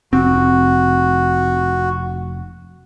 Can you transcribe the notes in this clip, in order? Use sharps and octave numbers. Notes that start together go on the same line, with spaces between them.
F1 C4 F#4